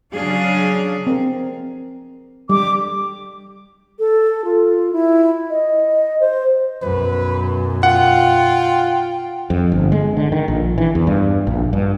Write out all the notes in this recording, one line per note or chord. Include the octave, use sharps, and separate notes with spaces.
C#3 F#3 C#4 D4 G#4 F5
C4 A#4
G3 D6
A4
F4
E4
D#5
C5
B1 F#2 B4
F4 F#5 G5
F2
G1
G#3
D3
D#3
A#1
E3
E2
G2
A#1
G2